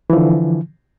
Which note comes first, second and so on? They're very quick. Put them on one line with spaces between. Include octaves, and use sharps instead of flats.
E3 F3 D3